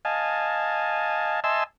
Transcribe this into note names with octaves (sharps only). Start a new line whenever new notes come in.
D#5 F5 G#5 A5
D#5 E5 G#5 A5 C6 E6